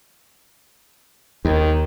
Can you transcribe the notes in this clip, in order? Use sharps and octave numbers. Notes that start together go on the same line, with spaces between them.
D#2 D#3